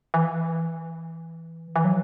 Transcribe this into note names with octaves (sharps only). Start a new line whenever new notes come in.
E3
E3
F#3